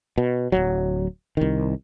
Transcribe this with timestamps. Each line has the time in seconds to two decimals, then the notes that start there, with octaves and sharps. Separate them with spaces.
0.18 B2
0.52 D1 G1 F#3
1.37 C2 D#3